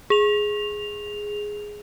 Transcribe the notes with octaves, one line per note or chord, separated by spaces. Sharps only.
G#4 F7